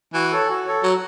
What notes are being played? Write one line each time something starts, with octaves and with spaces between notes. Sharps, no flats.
E3 F#4
A4 C#5
F#4
A4 C#5
F#3 F#4